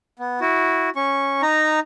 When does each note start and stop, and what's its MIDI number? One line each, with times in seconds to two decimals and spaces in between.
0.19 0.40 59
0.41 0.90 64
0.41 0.90 66
0.96 1.42 61
0.96 1.42 85
1.42 1.80 63
1.42 1.80 82